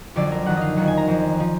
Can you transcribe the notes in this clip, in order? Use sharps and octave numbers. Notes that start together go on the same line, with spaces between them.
F2 D3 F#3 D5
A#4
F#2 D#3 F#3 F#5
D#5 F5
F2 D#3 F#3 F#5
G#5
A#5
F2 F3
F3